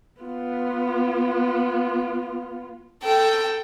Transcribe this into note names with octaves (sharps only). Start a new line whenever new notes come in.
B3 F4
A4 G5